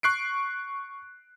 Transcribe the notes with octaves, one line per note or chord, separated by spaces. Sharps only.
C#6 F#6 C7 D7